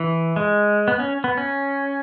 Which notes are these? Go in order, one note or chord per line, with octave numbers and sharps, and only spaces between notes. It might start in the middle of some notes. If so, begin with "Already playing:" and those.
Already playing: E3
G#3
B3
C#4
B3
C#4